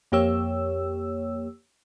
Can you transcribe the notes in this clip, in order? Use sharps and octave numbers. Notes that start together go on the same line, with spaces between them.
F2 A#3 G4 C#5 E6